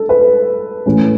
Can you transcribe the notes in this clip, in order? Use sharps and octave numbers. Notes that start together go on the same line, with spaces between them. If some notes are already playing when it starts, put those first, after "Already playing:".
Already playing: A4
B4
A2 E3 A3 C#4